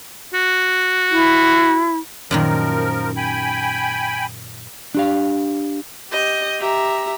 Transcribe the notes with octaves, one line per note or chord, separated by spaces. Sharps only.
F#4
E4
F#2 A#2 D#3 F3 A#4
G5 G#5 B5
D4 G4 F5
G4 D#5 G6
G4 E5 A#5